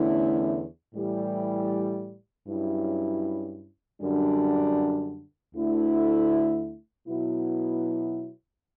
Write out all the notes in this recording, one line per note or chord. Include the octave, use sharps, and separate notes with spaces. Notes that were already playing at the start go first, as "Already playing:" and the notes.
Already playing: E2 D3 A3 C#4 E4
A2 E3 G3
G2 F#3 C#4 E4
F#2 D3 G3 D4
D2 D3 A3 E4
B2 F#3 B3 E4